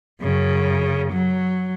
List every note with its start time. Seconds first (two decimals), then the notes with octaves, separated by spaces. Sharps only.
0.21 F#2 C#3
1.13 F#3